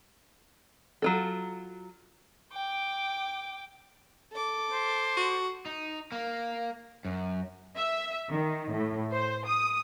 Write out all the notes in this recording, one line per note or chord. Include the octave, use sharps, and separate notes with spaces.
F#3 F4 A4
G5 D6
A4 D6
C5
F#4
D#4
A#3
F#2
E5
D#3
A2
C5
D#6